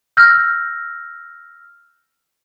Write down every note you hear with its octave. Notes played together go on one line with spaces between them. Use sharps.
E6 F6 G6 A#6